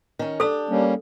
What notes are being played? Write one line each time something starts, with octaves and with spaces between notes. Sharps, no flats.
D#3 C#4
D4 G4 A4 E6
G3 A#3 C#4